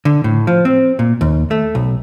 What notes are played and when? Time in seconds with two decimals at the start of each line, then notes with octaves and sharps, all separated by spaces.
0.05 D3
0.24 A2
0.47 F3
0.65 C4
0.99 A#2
1.21 D#2
1.51 A3
1.75 B1